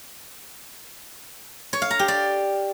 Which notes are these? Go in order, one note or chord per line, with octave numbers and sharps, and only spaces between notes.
C#5
F5
A#5
G4
D5